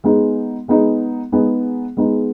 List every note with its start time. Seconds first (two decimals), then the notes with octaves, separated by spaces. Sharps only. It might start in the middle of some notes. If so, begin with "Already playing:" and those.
0.04 G#3 B3 D#4 G#4
0.68 G#3 B3 D#4 G#4
1.32 G#3 B3 D#4 G#4
1.97 G#3 B3 D#4 G#4